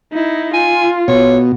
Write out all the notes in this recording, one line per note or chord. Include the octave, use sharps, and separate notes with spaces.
D#4 E4
F4 G#5
B2 C#5